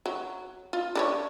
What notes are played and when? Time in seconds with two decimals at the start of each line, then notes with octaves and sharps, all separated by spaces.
0.06 F#3
0.73 F4
0.95 D4 B4 C#5